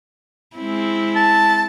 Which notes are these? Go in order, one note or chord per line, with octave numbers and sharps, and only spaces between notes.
G#3 C4 E4
A5